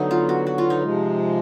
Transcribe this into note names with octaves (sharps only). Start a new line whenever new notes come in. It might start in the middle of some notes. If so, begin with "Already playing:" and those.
Already playing: D3 F#3 A3 B3 D#4
F4
F#4
F#4
F4
D#4
C3 F3 G#3